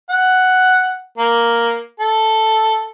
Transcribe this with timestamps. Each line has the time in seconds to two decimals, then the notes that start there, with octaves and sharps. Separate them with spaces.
0.10 F#5
1.18 A#3
2.00 A4